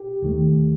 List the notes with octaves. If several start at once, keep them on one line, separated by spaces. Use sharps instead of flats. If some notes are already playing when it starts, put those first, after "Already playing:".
Already playing: G4
D#2 D#3 A3